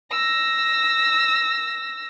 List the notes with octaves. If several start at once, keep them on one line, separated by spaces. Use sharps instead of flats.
E6 A#6